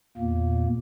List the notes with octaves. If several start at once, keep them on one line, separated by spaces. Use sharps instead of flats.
E2 A#2 A#3